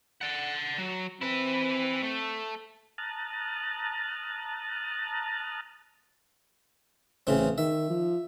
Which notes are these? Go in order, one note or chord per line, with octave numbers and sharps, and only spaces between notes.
D5 F#5
F#3
C4 E4 B4
A3
A5 A#5 D#6 F6 F#6 A6
A1 C#3 E3 C4
D#3 E5
F3